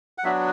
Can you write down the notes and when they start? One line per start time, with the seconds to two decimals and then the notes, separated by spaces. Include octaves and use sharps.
0.18 F#5
0.24 F#3 B3 D4 F#4 E5